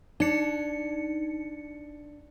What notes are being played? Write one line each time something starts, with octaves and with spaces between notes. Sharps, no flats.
D4 D#4 C#7